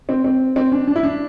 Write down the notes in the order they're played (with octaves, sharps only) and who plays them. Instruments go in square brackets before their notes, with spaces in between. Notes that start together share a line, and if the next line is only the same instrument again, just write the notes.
[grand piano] C4
C4
C4
D4
D4
E4
D4